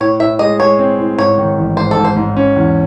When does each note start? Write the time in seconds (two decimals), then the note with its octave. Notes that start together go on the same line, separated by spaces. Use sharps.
0.01 A2 C#5
0.20 A2 E5
0.39 G#3 D#5
0.60 G#3 C#5
0.79 C4
0.98 A2
1.18 G#2 C#5
1.38 D#3
1.58 A1
1.77 G#2 C5
1.91 A4
1.97 G#2
2.05 C5
2.16 G#2
2.37 C#4
2.56 E2